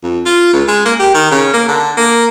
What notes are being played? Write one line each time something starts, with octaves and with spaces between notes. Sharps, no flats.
F2
F4
C#2
G#3
A#3
G4
D#3
C#3
A#3
D3
A#3